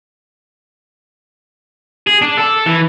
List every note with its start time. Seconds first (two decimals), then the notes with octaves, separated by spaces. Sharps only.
2.07 G#4
2.22 D4
2.37 A4
2.66 E3